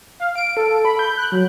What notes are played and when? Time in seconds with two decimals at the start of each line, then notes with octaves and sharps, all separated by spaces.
0.20 F5
0.35 D7
0.57 A4
0.85 B5
0.99 G6
1.18 F#6
1.32 F#3